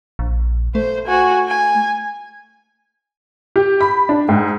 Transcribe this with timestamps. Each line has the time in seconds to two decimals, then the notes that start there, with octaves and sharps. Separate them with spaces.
0.19 A#1
0.75 A3 C5
1.07 F#4 G#5
1.48 G#5
3.56 G4
3.81 B5
4.09 D4
4.29 G#2